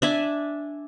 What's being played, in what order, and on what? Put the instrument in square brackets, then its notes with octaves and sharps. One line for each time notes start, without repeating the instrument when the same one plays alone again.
[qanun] D4 E5 G#5